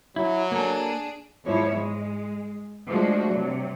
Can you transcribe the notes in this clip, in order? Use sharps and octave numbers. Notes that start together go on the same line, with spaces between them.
F#3 E4
A#3 D4 G#4 A4
E2 G#2 F3 E4 C#5
G#3
F3 G#3 A3 D4 F#4
C3 F#3